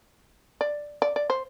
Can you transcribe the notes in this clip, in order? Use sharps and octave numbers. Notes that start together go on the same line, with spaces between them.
D5
D5
D5
C5